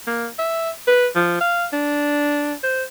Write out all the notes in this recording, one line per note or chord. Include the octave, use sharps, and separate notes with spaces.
A#3
E5
B4
F3
F5
D4
C5